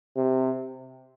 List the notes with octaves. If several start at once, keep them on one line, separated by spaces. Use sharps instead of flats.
C3